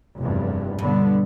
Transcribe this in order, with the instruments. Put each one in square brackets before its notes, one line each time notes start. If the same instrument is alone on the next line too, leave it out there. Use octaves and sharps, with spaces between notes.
[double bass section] F1 E2 G2
[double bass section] B1 D3 B3 [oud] G2